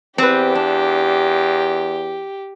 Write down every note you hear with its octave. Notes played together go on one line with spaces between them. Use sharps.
E2 C4 G4 B4
D4